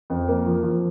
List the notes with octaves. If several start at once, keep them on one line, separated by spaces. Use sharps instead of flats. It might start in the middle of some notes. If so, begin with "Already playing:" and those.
F2
A#3
F3
F3